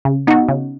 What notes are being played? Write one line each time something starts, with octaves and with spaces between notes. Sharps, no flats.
C#3
B3 D#4 F#4
C#3